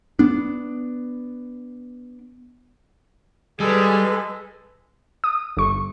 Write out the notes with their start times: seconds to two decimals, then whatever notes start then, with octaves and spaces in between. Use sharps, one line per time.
0.19 B3 D4
3.60 G3 G#3 G#4 A4 B4
5.24 D#6
5.57 G1 C#6